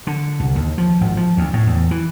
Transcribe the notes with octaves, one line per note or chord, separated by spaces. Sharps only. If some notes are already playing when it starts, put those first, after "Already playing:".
D3
C2
D#2
F3
G#1
F3
D2
A2
E2
E3